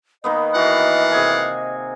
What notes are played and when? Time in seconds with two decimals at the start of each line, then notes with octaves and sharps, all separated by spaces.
0.24 D#3 A#3 B3 D#5
0.55 E3 F#4 D5 F5 F#5
1.12 C3 G#4 G#5